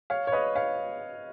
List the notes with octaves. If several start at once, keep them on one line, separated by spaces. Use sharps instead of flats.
C#5 F5
C#5
B4 D#5
C#5 F5